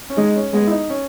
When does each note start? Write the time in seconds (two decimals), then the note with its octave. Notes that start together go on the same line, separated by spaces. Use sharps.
0.10 C#4
0.17 G#3 D#4
0.36 C#4
0.53 G#3 B3
0.67 E4
0.71 D#4
0.90 C#4